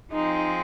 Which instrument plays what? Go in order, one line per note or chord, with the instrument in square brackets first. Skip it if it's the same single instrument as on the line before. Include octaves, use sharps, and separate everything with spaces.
[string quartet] F3 G#3 C4 [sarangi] D#4